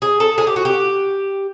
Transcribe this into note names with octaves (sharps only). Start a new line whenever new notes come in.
G#4
A4
G#4
G4
F#4
G4